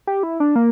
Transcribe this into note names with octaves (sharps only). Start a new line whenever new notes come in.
G4
E4
D4
A#3